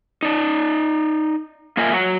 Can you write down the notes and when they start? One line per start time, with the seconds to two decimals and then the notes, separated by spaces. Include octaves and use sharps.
0.23 D#4 D5
1.77 A#3 F4 A#4 D#5 E5 G#5
1.93 F#3 F#4